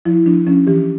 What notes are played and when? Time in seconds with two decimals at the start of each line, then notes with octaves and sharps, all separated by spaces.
0.05 F3 E4
0.26 F3 D4
0.47 F3 C#4
0.67 E3 G4